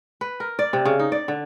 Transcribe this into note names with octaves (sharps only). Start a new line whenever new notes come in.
B4
A#4
D5
C3
C#3
D#4
D5
D3